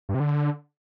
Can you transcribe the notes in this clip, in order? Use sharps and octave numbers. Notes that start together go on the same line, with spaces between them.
G2
C3
D3